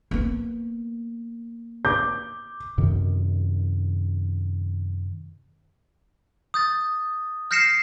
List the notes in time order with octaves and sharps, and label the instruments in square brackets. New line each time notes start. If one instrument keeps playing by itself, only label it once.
[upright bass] A#3 B3
[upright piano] D6 G6
[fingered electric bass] F#2 C3 D#3
[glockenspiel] D#6 G6 A6
F6 G6 A#6 C7 C#7 E7